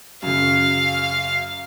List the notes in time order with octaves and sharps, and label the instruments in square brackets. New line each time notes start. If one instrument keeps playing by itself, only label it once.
[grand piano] F#2 C#3 [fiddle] F5